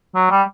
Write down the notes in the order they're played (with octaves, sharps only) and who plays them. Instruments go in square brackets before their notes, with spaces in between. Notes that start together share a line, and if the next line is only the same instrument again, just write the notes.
[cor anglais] F#3
G3